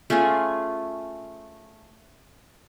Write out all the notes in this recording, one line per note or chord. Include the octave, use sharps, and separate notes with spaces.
A3 C#4 F4 G#4